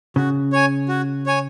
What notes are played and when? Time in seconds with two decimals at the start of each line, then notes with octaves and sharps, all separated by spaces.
0.16 C#3 F#4
0.53 C#5 G#5
0.89 F#4
1.26 C#5 G#5